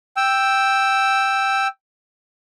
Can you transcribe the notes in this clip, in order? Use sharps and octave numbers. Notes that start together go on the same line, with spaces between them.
G5 E6